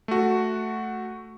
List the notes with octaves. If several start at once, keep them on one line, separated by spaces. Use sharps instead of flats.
A3 F#4